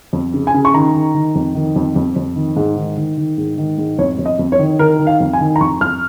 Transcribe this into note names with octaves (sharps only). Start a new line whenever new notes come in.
F2
C#3
G#5
C#3
C#6
D#3 A#5
D#3
D#3
F2
D#3
F2
F2
F2
D#3
G#2
D#3
D#3
D#3
G#2
D#3
G#2
F2 C#5
F2
D#5
F2
C#5
D#3
D#3 A#4
D#3
F5
F2
G#5
D#3
A#5
F2 C#6
F2 F6